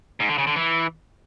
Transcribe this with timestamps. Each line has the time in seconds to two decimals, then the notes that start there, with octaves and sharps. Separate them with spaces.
0.20 G#2
0.29 D3
0.38 C#3
0.47 D3
0.56 E3